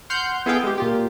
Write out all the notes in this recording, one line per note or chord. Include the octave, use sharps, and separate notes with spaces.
F#5 C6 F6 G6
B3 E4 G#4 A4 F5 G5
G#3 G4
A#2 F4 G4